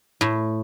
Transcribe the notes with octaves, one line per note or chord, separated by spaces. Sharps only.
A2